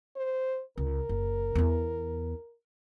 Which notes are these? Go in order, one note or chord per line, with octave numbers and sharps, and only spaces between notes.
C5
C#2 A#4
F#1
E2 B3